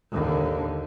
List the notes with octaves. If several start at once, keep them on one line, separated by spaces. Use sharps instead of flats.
D#2 D3